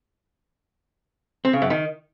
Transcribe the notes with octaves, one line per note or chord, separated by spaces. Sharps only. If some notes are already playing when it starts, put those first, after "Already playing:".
C4
C#3
F#2
D#3